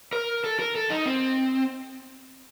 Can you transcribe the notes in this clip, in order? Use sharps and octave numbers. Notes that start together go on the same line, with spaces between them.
A#4
A4
A#4
A4
D#4
C4